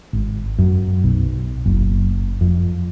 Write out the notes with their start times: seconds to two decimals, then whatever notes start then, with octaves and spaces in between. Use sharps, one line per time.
0.13 G#1
0.59 F#2
1.04 B1
1.66 F#1
2.41 F2